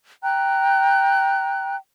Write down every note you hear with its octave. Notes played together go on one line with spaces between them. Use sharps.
G5 A#5 F#6